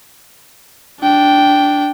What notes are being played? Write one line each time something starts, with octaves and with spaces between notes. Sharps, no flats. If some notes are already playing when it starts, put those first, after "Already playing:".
D4 G5